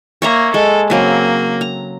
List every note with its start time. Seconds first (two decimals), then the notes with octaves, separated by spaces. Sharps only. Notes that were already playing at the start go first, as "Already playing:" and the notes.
0.22 A#3 C#5 E5 A#5
0.54 G#3 A4
0.90 C#3 F#3 A#3 C4
1.61 A#5